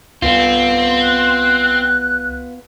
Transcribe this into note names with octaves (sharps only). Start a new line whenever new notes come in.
C2 B3 C4 F4
F#6